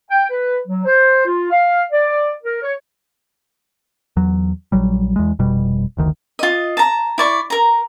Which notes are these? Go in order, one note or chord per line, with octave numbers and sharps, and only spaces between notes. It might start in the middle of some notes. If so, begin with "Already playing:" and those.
G5
B4
F#3
C5
F4
F5
D5
A#4
C#5
E2 F#3
A#1 F#3 G3
E2 G#3
F1 B2 G3
F#1 D2 D#3
F4 D#5
A5 A#5
E4 D5 C#6
A#4 A#5